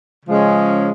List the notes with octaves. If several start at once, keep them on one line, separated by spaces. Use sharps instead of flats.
C#3 F3 G#3 C#4